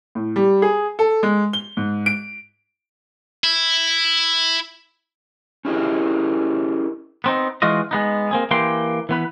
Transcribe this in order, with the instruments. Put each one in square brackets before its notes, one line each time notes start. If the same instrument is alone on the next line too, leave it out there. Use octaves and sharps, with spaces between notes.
[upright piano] A2
G3
G#4
A4
G#3
G7
G#2
D7
[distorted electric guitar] E4
[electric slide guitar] C#4 E4 G4 G#4 A#4 D#5
[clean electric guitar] B3 C4 D#4
E3 G#3 F4 F#4 D#5
G#3 B3 D#4
A#3 C4 G#4
E3 A#3 G4 G5 C6
E3 B3 B4